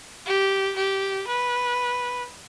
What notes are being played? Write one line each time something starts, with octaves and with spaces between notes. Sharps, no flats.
G4
G4
B4